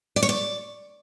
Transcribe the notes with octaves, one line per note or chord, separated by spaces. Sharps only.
D5
C#5
D5